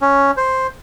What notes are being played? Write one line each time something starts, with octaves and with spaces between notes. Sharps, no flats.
C#4
C5